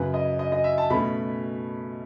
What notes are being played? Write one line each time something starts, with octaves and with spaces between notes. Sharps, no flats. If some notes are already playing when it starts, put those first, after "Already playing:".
Already playing: F#2 C#3 F#3 B4
D#5
D#5
D#5
E5
A5
B2 A3 C#4 B5